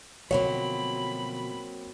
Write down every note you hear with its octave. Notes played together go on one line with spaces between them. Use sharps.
B2 D3 F3 F#3 A#3 C4 C#5 B5